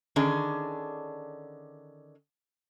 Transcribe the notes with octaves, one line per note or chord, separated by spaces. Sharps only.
D3 D#3 C#4 D4 G#4